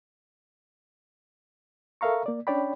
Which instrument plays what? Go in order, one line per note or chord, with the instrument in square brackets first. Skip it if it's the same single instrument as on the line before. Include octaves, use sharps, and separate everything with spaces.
[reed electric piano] A4 A#4 E5 F5 A#5 C#6
A#3 D5
C#4 D4 C#5 D5 G5 B5